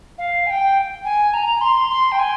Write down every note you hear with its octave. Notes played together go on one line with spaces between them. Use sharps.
F5
G#5
G5
G#5
A#5
C6
C6
G5
G#5